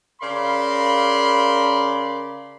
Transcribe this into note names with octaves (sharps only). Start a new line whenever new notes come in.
C#3 A#4 D5 F5 B5 C6